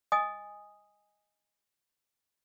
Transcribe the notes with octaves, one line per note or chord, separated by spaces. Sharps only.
D#5 G#5 D#6